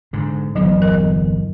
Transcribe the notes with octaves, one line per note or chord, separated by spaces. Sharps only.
G#2 D3
G1 E2 D3 F#3
A#4 D#5